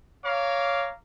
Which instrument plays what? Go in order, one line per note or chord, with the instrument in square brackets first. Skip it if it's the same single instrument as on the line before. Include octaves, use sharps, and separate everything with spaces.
[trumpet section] C#5 F5 A#5 D6